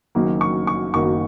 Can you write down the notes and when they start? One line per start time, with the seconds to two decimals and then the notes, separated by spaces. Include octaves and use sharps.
0.15 F#1 F#2 D#3 A#3
0.41 C#6
0.67 C#6
0.94 F#1 F#2 D#3 A#3 C#6